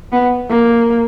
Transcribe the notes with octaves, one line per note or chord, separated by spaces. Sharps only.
B3
A#3